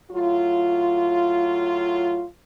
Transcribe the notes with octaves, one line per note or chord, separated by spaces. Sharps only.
A2 F#3 F4